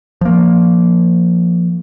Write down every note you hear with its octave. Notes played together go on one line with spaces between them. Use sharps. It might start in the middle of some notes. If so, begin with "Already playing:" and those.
F3 A#3